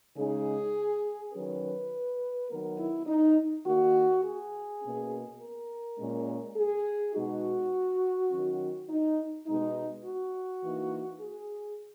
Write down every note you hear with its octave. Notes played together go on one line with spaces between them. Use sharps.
C#3 G#3 D#4 G#4
D#3 F#3 C#4 B4
D#3 F#3 B3 A#4
E4
D#4
D#3 A#3 D#4 F#4
G#4
B2 A#3 C#4
A#4
A#2 G#3 C#4
G#4
B2 G#3 D#4 F#4
D#3 F#3 C#4
D#4
B2 G#3 D#4
F#4
E3 A#3 D#4
G#4